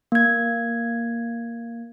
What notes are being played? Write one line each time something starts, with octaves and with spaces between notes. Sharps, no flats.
A#3 G#6